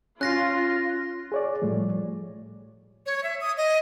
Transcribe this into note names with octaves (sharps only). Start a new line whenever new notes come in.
C#4 F4 F#6 A#6 C7
G#4 C#5 D5
A2 F3 G3 A3
C#5
E5
D#6
D#5